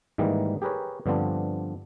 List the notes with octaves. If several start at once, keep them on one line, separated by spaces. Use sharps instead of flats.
G#2 D#3 E3 G3 A#3
G4 G#4 A#4 B4 C#5
G2 D3 F3 B3 C4 D4